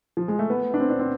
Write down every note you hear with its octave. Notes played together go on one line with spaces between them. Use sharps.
F3
G#3
A3
B3
D4
C4
D4
C4